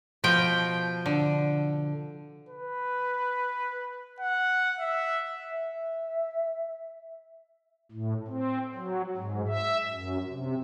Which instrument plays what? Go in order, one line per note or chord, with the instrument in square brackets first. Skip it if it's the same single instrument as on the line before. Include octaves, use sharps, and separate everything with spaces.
[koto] B2 F3 G5
D3
[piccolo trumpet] B4
F#5
E5
[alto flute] E5
[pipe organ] A2
C4
F#3
G#2
E5
F#2
C3